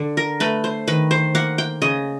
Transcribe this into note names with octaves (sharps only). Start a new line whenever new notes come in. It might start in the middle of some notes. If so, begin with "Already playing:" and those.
Already playing: D3
A#4
A3 B4
C5
D#3 B4
C5
A#3 F#5
G5
C#3 D#5